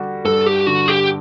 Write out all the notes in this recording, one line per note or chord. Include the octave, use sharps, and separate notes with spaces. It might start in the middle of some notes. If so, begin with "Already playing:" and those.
Already playing: D3 G3 F#4
G2 A4
G4
D3 F#4
G4